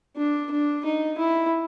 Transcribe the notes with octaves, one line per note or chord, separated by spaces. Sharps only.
D4
D4
D#4
E4